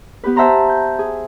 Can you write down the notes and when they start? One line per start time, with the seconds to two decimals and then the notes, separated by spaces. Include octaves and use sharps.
0.24 B3 G4 B4
0.36 C5 E5 F#5 A5 A#5 C6
0.69 G6
0.99 G#4